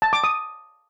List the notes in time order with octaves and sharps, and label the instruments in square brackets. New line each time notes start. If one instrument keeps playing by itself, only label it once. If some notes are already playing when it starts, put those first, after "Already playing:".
[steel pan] A5
D6
D#6